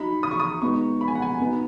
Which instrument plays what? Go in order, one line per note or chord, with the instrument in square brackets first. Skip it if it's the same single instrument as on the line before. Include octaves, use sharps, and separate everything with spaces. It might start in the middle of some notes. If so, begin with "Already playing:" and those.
Already playing: [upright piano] F#3 D#4 B5
D#6
C#6
D#6
B2 G#3 B3 D#4 C#6
B5
G#5
F#5
G#5
B2 B3 D#4